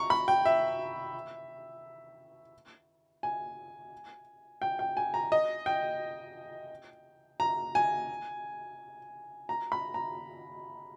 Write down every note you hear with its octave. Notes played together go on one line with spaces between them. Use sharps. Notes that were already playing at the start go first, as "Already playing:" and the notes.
Already playing: A#5 C#6
B5
G5
E5
G#5
G5
G5
G#5
A#5
D#5
G5
A#5
G#5
A#5
B5
A#5